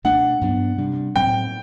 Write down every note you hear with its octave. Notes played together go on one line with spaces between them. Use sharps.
B2 A3 D4 F#5
G2 F#3 B3 D4
C3 G3 D4
A2 F#3 C4 G5